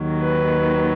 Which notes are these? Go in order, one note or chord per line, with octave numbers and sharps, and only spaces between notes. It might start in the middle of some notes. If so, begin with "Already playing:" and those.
Already playing: D#2 D#3 F#3
B4